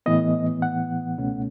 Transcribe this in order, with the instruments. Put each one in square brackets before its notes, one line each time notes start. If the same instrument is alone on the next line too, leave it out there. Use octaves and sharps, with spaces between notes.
[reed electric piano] A2 E3 B3 D#5
F#5
C#2 B2 A3 C#4